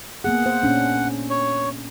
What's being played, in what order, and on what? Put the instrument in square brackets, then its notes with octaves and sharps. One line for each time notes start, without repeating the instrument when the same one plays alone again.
[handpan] A#3 B3 G#4 [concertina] F#5
[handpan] C5
A#2 C#4 D4
[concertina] C#5